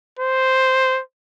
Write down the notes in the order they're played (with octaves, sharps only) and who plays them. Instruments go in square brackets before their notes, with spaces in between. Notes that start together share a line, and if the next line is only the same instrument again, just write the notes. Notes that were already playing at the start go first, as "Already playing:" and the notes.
[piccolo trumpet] C5